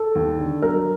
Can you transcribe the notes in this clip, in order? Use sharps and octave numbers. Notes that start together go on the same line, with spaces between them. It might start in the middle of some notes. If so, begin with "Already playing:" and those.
Already playing: A4
D#2
D3
F#3 A#4